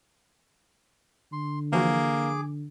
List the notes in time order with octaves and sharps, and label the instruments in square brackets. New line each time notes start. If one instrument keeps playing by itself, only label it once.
[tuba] D3 [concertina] C6
[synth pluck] E3 F3 F#4 [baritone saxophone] A#3 [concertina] G#4 D6